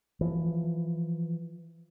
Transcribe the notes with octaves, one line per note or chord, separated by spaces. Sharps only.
E3 F3